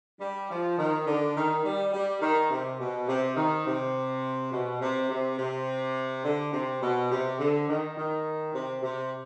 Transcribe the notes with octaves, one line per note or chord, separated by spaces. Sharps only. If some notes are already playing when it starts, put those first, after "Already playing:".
G3
F3
D#3
D3
D#3
G3
G3
D#3
C3
B2
C3
D#3
C3
B2
C3
C3
C3
D3
C3
B2
C3
D3
D#3
D#3
C3
C3